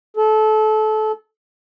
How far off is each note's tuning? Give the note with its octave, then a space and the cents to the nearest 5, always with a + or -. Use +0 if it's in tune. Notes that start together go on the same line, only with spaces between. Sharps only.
A4 -25